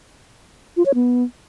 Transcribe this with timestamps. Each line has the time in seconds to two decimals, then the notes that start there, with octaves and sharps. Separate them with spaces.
0.77 F4
0.86 C#5
0.95 B3